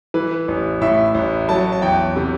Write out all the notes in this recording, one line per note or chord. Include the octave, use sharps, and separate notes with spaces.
E3 B4
A1
A2 E5
A1
F#3 A5
A5
E2 G5
C3